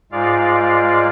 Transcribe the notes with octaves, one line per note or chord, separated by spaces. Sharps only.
G#2 G#3 F4 D5 F5